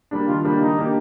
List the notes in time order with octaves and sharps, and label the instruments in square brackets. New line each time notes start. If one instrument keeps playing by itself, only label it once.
[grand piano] G3 A#3 D4
[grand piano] D#3 [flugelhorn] F4
[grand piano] G3 A#3 D4
[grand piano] D#3 [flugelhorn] D#4
[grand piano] A#3 D4 G4